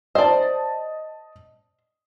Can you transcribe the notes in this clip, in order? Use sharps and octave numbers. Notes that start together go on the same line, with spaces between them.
C5 D5 D#5 A5